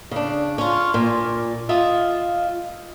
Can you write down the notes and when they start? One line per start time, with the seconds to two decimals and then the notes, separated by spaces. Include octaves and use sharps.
0.11 C#3 D4
0.58 C#4 F4
0.94 A#2
1.69 F4 D#5 E5